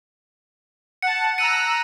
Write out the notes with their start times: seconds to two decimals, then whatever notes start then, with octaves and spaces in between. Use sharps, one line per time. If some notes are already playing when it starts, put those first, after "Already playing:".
1.02 F#5 A5 C#7
1.38 A#5 E6 F#6 C#7 D#7